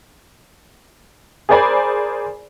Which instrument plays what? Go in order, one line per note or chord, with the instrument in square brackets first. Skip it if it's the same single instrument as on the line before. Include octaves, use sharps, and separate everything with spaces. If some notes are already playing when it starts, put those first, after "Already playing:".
[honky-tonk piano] G#4 A#4 C5 D5 G#5 B5